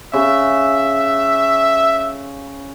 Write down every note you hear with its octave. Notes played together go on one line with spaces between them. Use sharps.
C#3 E5